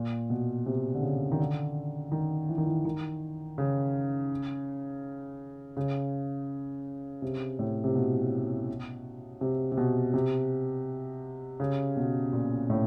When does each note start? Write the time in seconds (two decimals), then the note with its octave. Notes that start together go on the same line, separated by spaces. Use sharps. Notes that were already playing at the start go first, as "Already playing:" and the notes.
Already playing: A#2
0.30 B2
0.66 C3
0.94 D3
1.03 C#3
1.32 D#3
1.40 D3
2.12 D#3
2.49 E3
2.58 D#3
2.67 E3
2.85 D#3
3.58 C#3
5.77 C#3
7.22 C3
7.59 A2
7.84 C3
7.95 B2
9.41 C3
9.72 C3
9.77 B2
10.14 C3
11.60 C#3
11.97 B2
12.33 A#2
12.70 A2